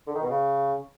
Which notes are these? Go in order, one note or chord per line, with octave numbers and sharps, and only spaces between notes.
D3
D#3
B2
C#3